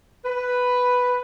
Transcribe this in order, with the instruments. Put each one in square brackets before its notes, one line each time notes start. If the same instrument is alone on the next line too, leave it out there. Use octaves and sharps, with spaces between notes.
[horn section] B4